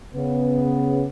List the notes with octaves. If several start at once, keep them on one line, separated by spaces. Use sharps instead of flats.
C#3 B3